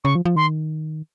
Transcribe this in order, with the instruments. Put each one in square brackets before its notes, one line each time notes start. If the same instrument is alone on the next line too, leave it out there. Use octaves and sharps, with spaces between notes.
[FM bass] C#3 [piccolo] C#6
[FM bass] F3
F3
[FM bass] D#3 [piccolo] C6